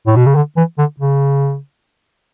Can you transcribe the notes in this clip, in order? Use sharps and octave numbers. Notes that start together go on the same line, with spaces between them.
A2
B2
C#3
D3
E3
D3
C#3